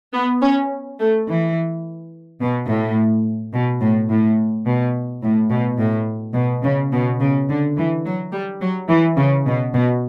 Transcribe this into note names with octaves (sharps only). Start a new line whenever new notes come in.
B3
C#4
A3
E3
B2
A2
B2
A2
A2
B2
A2
B2
A2
B2
C#3
B2
C#3
D3
E3
F#3
G3
F#3
E3
C#3
B2
B2